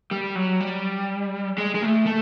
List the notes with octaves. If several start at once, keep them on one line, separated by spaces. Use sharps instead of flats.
G3
F#3
G3
G#3
G#3
A3
A3